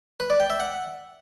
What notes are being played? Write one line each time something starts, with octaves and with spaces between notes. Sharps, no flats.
B4
D5
G5
E5
F#5